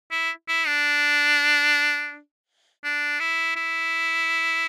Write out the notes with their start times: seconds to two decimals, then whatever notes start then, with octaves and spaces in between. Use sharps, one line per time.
0.11 E4
0.48 E4
0.67 D4
2.84 D4
3.20 E4
3.56 E4